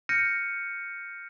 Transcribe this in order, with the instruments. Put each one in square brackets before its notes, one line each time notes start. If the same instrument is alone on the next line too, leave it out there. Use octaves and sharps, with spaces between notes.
[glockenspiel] F6 G6 A#6 C#7 D#7